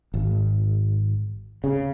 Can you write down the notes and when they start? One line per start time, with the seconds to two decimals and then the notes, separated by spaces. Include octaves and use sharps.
0.14 G#1
1.64 C#3